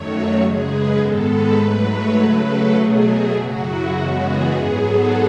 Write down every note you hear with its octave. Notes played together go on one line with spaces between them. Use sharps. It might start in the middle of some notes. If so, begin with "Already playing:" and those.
Already playing: F#2 D#3 F#3 A3 C#5
F#4
F#2 C#3 G#3 G#4
B4
G#2 D#3 G#3 B3 A4
B4
G#2 F#3 A3
C#5
C#3 F#3 A3 B4
A4
B2 F#3 A3 G#4
G#4
F#2 C#3 F#3 F#4
E4
F#2 C#3 E3 G#3 B3 F#4
G#4
G#2 F#3 B3
A4